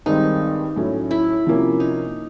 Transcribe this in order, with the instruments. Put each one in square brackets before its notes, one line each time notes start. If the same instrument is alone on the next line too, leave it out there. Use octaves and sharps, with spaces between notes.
[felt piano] G2 D#3 G#3 C4 [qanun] D#4
[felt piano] A2 F#3 A3 C#4
[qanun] E4
[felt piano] C3 F3 A#3 C#4
[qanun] D#4